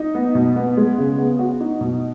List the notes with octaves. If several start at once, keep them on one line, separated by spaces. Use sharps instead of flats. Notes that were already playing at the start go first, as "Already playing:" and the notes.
Already playing: D#4
B3
B2
B3
G#3
C#3
B3
F#4
D#4
B2